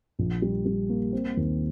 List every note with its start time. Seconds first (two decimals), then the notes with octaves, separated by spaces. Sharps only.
0.19 A#1
0.42 G3
0.66 G3
0.89 A#3
1.13 C4
1.37 D#2